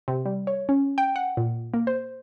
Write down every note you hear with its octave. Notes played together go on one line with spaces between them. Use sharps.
C3
G3
C#5
C#4
G5
F#5
A#2
A#3
C5